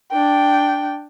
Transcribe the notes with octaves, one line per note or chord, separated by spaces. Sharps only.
D4 G5